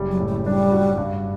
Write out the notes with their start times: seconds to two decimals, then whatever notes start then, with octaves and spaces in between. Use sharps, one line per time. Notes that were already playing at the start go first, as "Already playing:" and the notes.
Already playing: F#1 G3
0.11 F#3
0.20 A2
0.28 A3
0.45 G3 D4
0.72 F#4
0.97 G2